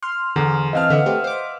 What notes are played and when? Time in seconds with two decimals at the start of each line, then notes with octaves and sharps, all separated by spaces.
0.02 C6 F6
0.36 E2 D3
0.73 E3 C4 D#5 F5 A5 F6
0.90 D3 B4 E5 F#5
1.06 A3 C4 G4
1.24 C5 D6